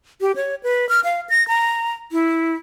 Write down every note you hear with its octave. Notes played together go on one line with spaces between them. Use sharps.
G4
C#5
B4
F6
F5
A#6
A#5
E4